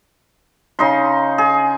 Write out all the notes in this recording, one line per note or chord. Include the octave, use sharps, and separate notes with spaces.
C#3 D#4 C6
G#4